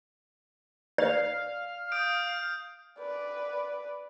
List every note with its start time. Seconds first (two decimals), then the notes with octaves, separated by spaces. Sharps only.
0.98 D5 F5
1.92 D#6 G6 D7
2.99 B4 D5